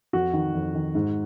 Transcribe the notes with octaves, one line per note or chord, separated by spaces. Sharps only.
F2 F#4
D#3
F2
D#3
G#2